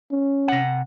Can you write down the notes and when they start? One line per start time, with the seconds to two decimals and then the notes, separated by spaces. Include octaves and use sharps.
0.11 C#4
0.48 C3 F#5